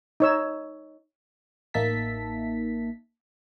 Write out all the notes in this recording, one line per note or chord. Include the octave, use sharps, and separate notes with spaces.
D#4 C#5 E6
A1 A#3 D#4 E5 A5 B6